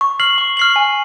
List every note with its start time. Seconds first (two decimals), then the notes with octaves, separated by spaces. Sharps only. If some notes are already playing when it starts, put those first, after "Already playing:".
0.01 C#6
0.20 F6 C7 F#7
0.38 C#6
0.57 F6 C7 F#7
0.76 G#5